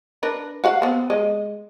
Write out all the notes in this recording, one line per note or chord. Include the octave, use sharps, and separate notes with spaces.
D4 A#4 B4
F#4 F5 F#5
B3 C4
G#3 D#5